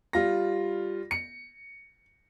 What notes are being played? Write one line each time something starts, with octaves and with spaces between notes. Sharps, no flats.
G3 F4 A#6
C#7